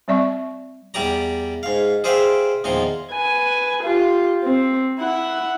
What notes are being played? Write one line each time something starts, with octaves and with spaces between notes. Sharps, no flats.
G3 C4 D5 E5 C#6
E2 G3 G4 D5 A#5
G#2 F5
G#4 C5 D5 E5 F5 G5
E2 A#2 D#3 F3 C6
B4 G#5
F4 G4
C4
E4 F#5